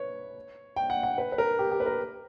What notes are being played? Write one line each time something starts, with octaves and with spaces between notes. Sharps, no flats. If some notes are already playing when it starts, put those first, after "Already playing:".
Already playing: B4 C#5
G5
F#5
F#5
B4
B4
A#4
G4
G4
B4
A#4